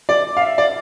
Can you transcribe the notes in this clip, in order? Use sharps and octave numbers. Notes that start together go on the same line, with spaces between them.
D5
F5
E5
D5